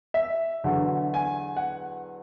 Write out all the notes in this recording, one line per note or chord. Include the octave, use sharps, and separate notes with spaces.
E5
E2 D3 F#3
G#5
F#5